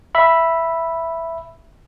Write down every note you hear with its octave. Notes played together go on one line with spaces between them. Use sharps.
E5 B5